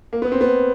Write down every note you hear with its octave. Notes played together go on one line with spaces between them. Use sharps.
A#3
B3
C4
B3